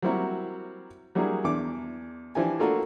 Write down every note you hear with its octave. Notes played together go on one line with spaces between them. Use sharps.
F#3 G3 A#3 C4 E4 F#4
F#3 G3 A#3 D4 E4 G#4
E2 E3 D4 D6
E3 F3 D4 E4 G4 G#5
A3 A#3 D4 F4 F#4 A4